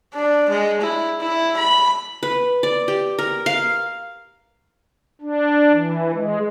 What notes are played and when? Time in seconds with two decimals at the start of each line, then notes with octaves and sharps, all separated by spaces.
0.14 D4
0.50 G#3
0.82 E4
1.20 E4
1.57 B5
2.23 B4
2.63 D5
2.88 G4
3.19 A#4
3.46 F5
5.21 D4
5.72 E3
6.14 G#3